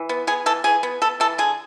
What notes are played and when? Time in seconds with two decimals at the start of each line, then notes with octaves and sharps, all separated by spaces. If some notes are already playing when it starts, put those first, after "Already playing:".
Already playing: E3
0.09 B3
0.27 B3 G#4
0.46 E3 A4
0.64 E3 G#4
0.83 B3
1.02 B3 A4
1.20 E3 A4
1.38 D3 G#4